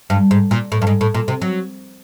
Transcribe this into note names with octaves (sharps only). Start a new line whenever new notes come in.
G2
G#2
A#2
A2
G2
G#2
A2
A#2
C3
F#3